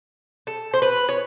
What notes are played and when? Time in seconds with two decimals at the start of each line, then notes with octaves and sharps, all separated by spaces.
0.47 A4
0.73 C5
0.82 B4
1.09 C#5